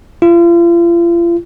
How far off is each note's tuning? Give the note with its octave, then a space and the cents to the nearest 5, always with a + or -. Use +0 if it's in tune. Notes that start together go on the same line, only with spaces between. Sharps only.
F4 -40